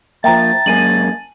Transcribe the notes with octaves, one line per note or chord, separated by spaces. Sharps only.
F3 A#3 E5 G5 A5 A#5
F#2 G#3 A#3 G#5 D#7 F#7